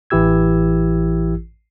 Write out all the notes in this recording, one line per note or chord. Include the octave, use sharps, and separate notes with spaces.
A1 E3 E4 G4 E6 G#6